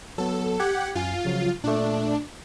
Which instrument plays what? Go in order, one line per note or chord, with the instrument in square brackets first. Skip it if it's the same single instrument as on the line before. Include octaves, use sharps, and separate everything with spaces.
[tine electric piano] F#3 B3 [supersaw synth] A4
[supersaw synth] G4 F#5 [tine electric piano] G#6
[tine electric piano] F#2 G#5 [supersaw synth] F4
[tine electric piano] C#3 F3 F#3
[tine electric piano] A#2 A3 [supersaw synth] D4